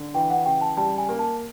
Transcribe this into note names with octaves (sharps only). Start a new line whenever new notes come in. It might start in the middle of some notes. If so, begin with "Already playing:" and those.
Already playing: D3
E3 G5
F#5
C#3 G5
A5
G3 A5
G#5
A#3
A5